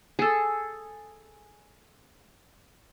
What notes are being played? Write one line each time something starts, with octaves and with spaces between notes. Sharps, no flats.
G#4 A4